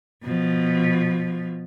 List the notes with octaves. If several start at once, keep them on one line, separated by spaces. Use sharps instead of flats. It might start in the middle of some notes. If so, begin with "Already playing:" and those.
B2 F3